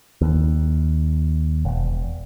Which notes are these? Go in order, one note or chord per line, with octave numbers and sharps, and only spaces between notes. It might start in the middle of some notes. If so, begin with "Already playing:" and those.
D#2
E1